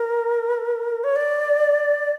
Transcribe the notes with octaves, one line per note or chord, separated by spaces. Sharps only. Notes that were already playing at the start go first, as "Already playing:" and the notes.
Already playing: A#4
C#5
D5